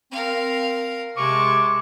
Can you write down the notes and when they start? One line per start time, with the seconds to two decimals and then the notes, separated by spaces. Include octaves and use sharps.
0.12 C4 A#4 F5
1.17 C3 G#3 A5 C#6 D6